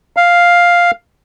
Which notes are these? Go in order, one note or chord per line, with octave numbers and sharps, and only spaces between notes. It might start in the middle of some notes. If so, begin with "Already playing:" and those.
F5